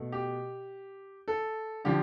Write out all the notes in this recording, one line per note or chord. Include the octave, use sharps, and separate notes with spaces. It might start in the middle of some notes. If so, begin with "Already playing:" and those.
Already playing: B2 A3
G4
A4
D3 F3 G4